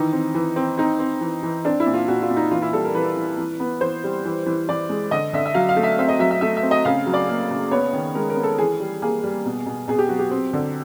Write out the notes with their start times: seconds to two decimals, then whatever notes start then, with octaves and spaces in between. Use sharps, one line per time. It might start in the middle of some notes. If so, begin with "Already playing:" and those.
Already playing: D#3 E3 D#4
0.12 C4
0.34 E3
0.56 C4
0.77 C4 D#4
0.99 C4
1.21 E3
1.43 E3
1.65 C4 D4
1.80 E4
1.86 A#2
1.94 F4
2.08 A#2 F#4
2.22 F4
2.30 A#2
2.36 D#4
2.51 E3 F4
2.62 E4
2.73 G3 A4
2.84 A#4
2.94 E3 B4
3.16 E3
3.38 E3
3.60 B3
3.81 E3 C5
4.04 G3
4.25 E3
4.46 E3
4.69 E3 D5
4.89 G#3
5.11 D3 D#5
5.33 D3 E5
5.46 E5
5.54 F#3 F5
5.69 F5
5.76 A3
5.83 E5
5.98 C4 E5
6.09 D#5
6.19 F#3 E5
6.31 E5
6.41 A3 E5
6.57 E5
6.63 C4
6.71 D#5
6.85 C#3 F5
7.06 F#3
7.14 D5
7.29 A#3
7.51 C#3
7.71 B3 C#5
7.93 D#3
8.15 G#3 A#4
8.30 A#4
8.36 B3
8.43 A4
8.58 E3 G#4
8.80 G3
9.02 A#3 G#4
9.23 G3
9.45 B2
9.66 B2
9.88 B2 G#4
9.99 G4
10.09 F#3 F#4
10.19 G4
10.31 C4
10.53 D3